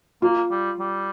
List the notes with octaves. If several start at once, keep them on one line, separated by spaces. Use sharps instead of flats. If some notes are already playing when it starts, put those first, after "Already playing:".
A#3 F4
G3
G3